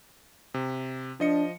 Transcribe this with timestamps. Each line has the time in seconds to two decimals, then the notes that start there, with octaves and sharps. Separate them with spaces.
0.54 C3
1.20 F3 D4 D#5 C#7